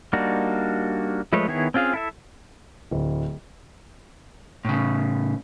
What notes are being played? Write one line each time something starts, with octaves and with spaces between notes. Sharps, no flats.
G3 A#3 D4 D#4 F#4
F3 G#3 A3 B4 C#5
D#3 B3 E4 G#4 C#5
C4 C#4 F4 G#4 F5
E4 A4 E5
D1
A2 C#3